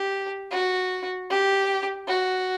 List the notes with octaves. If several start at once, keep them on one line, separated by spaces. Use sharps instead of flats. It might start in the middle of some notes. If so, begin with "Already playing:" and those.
Already playing: G4
F#4
G4
F#4